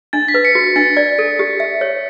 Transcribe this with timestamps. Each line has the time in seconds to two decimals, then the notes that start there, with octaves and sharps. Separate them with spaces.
0.13 D4 A6
0.28 B6
0.34 B4
0.45 C#7
0.55 F#4
0.76 D4 A6
0.97 D5
1.18 A4
1.39 G4
1.60 E5
1.81 C#5